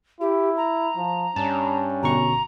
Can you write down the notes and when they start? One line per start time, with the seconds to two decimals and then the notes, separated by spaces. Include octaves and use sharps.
0.21 E4 G4
0.57 A#5
0.97 F3
1.36 G2 C#4 A5
2.03 G1 B2 A#5 C#6